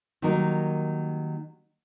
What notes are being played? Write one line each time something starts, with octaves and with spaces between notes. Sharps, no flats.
D#3 F#3 G3 A#3 D#4 A#4